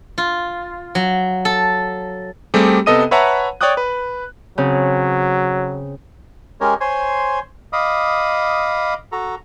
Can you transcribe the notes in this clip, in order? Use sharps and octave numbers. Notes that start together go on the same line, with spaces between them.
F4
F#3
A4
G3 A3 C4 G4 G#4
C3 B3 A4 D#5 D#6 D#7
B4 C#5 E5 F#5 A5 A#5
C#5 D5 G5 D6 D#6 F#6
B4
C#3 F#3 C4
G#3 C#4 G4 A#4 C#5
C5 C#5 G#5 C6
D#5 F5 B5 D6 D#6
F#4 A4 A#5